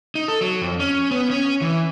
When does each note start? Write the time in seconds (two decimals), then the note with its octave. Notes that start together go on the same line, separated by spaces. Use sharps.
0.15 D#4
0.28 A4
0.41 F#3
0.62 F2
0.79 C#4
1.11 B3
1.30 C#4
1.62 E3